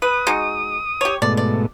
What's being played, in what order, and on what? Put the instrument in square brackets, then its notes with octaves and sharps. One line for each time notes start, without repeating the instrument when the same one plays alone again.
[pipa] B4 [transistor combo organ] D#6
[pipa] G#3 D#4 F#4
G4 C#5
[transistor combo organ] G#2 B2 A3 [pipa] D5
[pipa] D5